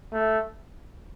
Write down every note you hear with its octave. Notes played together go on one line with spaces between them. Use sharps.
A3